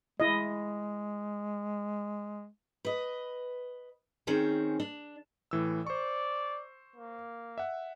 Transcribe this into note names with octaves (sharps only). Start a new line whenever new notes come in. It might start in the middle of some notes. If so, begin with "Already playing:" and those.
G#3 E4 D#5
B4 D#5
D#3 C4 C#4 G#4
D4
A2 E3 E6
C5 D5 C#6
A#3
E5 F#5